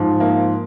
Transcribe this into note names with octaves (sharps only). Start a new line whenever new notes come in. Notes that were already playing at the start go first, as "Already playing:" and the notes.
Already playing: G#2 F3
A#3